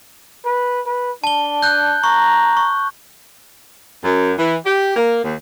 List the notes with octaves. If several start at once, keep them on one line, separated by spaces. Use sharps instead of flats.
B4
B4
D4 A5 G7
F#6 G6
A#5 C#6
C#6
F#2
E3
G4
A#3
D#2